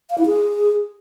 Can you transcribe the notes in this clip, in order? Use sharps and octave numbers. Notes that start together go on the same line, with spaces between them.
F5
E4
G#4